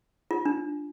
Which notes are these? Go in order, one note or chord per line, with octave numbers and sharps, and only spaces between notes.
F4
D4